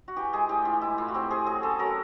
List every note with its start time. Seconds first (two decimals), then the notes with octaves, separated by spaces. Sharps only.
0.08 F#4
0.16 E3 G4
0.33 G#3 G#4
0.49 A2 G4
0.65 E3 F4
0.81 G#3 E4
0.98 A2 F4
1.08 F#4
1.14 C4 G4
1.30 C4 G#4
1.46 F#3 G#4
1.63 C#4 A4
1.79 F#3 A#4